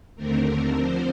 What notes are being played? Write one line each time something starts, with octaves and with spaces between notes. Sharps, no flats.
D#2 D3 A3 C4 A#4
D3 F3 C4 C5